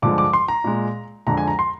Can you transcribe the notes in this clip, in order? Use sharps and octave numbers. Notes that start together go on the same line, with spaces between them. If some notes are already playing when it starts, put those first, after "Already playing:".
G2 D3 F3 G#3 D6
D6
C6
A#5
A#2 G#3
F2 D3 G#3 A#5
G#5
A#5
C6